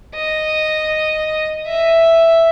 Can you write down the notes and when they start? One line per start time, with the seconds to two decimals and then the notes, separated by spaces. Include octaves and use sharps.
0.15 D#5
1.67 E5